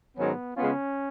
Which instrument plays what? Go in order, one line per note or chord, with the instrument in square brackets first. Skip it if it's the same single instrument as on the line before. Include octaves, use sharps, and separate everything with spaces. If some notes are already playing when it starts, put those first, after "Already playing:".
[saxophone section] G#2 D#3 F#3 C#4 [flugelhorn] B3
[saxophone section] C#3 G#3 B3 F4 [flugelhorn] C#4